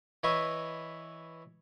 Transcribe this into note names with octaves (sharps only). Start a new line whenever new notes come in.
E3 B4 C#5 D#5 E5 C#6